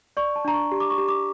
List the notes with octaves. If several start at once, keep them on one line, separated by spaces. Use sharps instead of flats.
D5 C#6
A5
D4 A#5
C#6
G4
D6
C#6
G4
D6